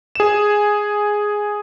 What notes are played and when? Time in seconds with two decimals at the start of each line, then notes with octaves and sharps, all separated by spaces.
0.15 G#4 E7